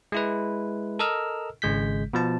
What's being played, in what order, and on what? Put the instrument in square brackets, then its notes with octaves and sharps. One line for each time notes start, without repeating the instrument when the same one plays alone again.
[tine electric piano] G#3 E4 B4
A4 A#4 D#5 E6 F6
G#1 C#3 G#3 G6 B6
B2 F3 A5